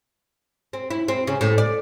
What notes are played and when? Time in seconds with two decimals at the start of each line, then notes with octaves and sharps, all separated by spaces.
0.73 C4
0.91 E4
1.08 C4
1.27 C#3
1.41 A2
1.58 D5